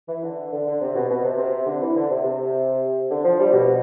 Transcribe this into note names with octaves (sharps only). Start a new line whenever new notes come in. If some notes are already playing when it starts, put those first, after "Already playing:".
E3
D3
D3
D3
C3
B2
B2
C3
C3
D3
E3
D3
C3
C3
D3
F3
G3
B2